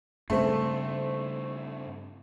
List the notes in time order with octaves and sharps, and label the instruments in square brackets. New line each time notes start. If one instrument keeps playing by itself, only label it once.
[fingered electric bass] G2 C#3 [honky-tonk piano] A3 C4